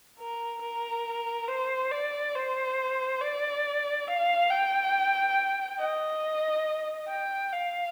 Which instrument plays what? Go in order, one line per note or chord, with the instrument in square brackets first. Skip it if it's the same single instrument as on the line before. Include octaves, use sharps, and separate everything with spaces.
[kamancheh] A#4
A#4
C5
D5
C5
D5
F5
G5
D#5
G5
F5